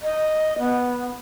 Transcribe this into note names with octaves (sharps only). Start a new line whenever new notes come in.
D#5
B3